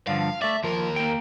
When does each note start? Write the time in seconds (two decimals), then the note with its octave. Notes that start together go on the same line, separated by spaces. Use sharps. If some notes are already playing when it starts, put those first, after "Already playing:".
0.07 G2 D3 F3 F5
0.42 A3 D5 E5
0.64 D#2 F3 A#4
0.96 A#3 G5